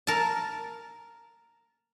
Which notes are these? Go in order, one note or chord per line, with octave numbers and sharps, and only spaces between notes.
A#4 A5